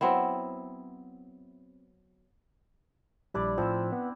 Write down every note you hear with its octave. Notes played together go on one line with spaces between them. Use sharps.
F#3 B3 C4 E4
A#1 G3 D4 E4 D5
A2 F3 C4 E4 E6
B3